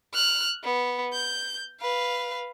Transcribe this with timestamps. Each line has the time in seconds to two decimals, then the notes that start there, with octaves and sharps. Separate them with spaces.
0.14 F6 F#6
0.64 B3
1.13 G6
1.81 B4 F5